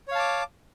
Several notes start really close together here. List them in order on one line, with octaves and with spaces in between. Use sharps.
C#5 F5 A5 D6